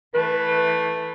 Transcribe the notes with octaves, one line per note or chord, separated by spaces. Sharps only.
E3 A3 B4